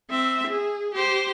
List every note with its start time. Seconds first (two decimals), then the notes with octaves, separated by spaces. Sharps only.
0.10 C4 E5
0.47 G#4
0.94 G4 C5